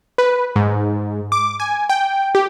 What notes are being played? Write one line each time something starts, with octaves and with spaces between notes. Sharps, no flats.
B4
G#2
D6
G#5
G5
G4